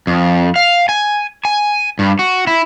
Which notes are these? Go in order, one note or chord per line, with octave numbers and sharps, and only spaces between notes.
F2
F5
G#5
G#5
G2
F#4
E4